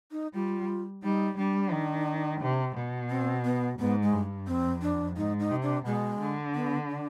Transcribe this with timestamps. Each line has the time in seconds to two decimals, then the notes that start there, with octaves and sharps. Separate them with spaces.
0.11 D#4
0.34 G3 F4
1.03 G3 D#4
1.37 G3 D4
1.72 D#3
2.41 C3
2.76 B2
3.10 C4
3.45 B3
3.79 G#2 B3
4.02 G#3
4.13 G2
4.47 F2 C4
4.82 D4
5.16 G#2 D#4
5.40 D#4
5.51 C3
5.63 D4
5.86 B2 G#3
6.20 D3
6.55 B3
6.89 D4